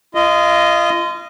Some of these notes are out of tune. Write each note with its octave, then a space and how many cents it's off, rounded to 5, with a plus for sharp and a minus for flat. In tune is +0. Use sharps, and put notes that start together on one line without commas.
F4 -30 D#5 +0